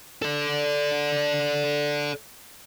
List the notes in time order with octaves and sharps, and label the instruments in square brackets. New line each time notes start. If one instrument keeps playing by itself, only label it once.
[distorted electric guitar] A4 D5